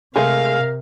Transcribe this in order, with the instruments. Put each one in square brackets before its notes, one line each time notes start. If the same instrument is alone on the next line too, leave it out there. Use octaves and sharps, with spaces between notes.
[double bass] C3 [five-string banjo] G#3 A3 G#4 [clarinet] A#4 [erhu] F5